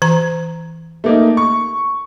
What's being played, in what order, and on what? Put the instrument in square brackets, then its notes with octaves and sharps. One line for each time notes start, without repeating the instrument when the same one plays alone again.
[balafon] E3 A#5
[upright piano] A3 A#3 D#4
C#6